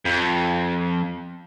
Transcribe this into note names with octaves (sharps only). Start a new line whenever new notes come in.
F2